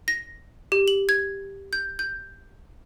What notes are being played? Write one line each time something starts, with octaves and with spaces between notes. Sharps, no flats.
A#6
G4
F#7
G#6
G6
G6